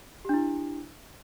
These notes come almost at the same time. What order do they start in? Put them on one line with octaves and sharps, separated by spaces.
G4 D4 E4